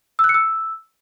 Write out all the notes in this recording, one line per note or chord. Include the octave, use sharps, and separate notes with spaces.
E6
F#6
C#7
E6